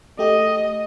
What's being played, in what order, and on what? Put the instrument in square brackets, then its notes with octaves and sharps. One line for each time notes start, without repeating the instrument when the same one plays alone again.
[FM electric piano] A3 G4 [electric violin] D#5